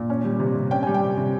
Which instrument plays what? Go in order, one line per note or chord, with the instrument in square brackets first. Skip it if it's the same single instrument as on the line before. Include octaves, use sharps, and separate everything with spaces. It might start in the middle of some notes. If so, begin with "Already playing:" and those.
Already playing: [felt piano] A#2
C#4
G3
C3
C3
C#4 G5
G3 G#5
G5
C3
C3